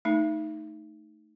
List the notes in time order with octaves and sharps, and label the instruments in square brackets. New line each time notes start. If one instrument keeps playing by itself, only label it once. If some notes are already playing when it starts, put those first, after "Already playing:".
[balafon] A3 D#4